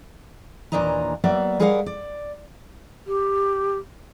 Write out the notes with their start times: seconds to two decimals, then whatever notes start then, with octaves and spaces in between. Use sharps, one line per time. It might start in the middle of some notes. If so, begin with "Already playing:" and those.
0.72 D#2 A#2 E3 D4 D#5 A#5
1.24 F#3 A#3 B3 D5 E5
1.60 G3 G#4 A#4 C#5 F5 F#5
1.86 D5
3.07 G4